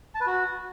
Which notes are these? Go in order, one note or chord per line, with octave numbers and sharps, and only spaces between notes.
A5
B4
F#4